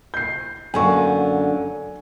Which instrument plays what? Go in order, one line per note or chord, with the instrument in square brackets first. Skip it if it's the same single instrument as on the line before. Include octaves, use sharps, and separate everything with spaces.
[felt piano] G6 C7
[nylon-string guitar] F#2 D3 A#3 [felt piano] G#5 C#6